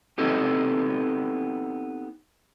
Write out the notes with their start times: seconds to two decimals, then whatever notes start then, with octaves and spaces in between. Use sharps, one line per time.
0.18 B3 C4 D#4 G4 A4